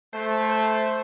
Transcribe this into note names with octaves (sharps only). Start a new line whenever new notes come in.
A3 C5
C5